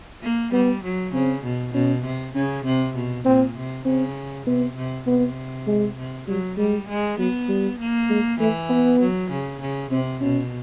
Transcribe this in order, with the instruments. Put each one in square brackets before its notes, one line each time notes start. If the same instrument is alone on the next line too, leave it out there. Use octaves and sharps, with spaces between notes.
[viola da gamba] A#3
[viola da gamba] G3 [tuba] B3
[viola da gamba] F#3
[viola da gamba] C#3 [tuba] C4
[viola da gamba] B2
[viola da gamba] B2 [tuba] C#4
[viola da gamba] C3
[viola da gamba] C#3 [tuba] C#4
[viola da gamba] C3 [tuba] C4
[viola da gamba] B2
[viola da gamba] A#2 [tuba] C4
[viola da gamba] C3
[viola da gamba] C#3 [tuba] C4
[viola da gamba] C3 [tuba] B3
[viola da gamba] C3
[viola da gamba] C3 [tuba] B3
[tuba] G#3
[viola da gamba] C3
[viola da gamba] F#3 [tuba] G3
[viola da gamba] G3 [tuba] G#3
[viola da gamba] G#3
[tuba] F#3 [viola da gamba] B3
[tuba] G3
[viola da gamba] A#3
[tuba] G#3
[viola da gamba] E3 [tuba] A3
[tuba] B3
[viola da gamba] F#3
C#3
C#3
[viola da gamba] C3 [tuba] C4
[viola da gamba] B2 [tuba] C#4